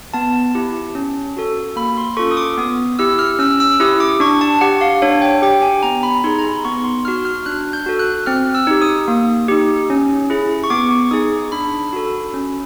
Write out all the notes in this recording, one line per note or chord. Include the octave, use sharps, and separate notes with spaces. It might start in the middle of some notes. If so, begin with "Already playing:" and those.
B3 A5
E4 G4
C#4
F#4 A4
A#3 B5
C6
C#4 F4 A4 C#6
D#6
D6
B3 D#6
E4 G4 E6
F6
C#4 E6
E6
E4 G4 D#6
D6
D4 C#6
A5
G4 F#5
F5
D4 C#5
G5
G4 G5
G#5
B3 A#5
B5
D#4 G#4 C6
A#5
B5
B3 C#6
C6
D#4 F#4 F6
F6
D4 F#6
G6
F#4 A4
F#6
C4 F6
E6
D#4 G4
D#6
A#3
D#4 G4
C#4
E4 G#4
C#6
B3 D6
C#6
D#4 G#4 D#6
D4 B5
F#4 A4
C#4